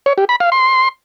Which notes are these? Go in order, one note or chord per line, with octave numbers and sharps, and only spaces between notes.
C#5
G4
B5
F5
C6